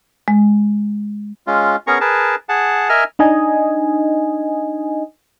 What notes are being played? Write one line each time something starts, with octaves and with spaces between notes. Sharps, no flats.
G#3
G#3 C#4 F4
B3 C#4 G#4 A#4 A#5 C#6
G#4 A#4 B4 A5
G#4 F#5 A5
A#4 D#5 E5 G#5 F6
D4 D#4 D#5 G#5